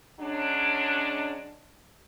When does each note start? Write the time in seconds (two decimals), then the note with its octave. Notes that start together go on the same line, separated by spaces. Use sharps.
0.20 F#3 G#3 C#4 D4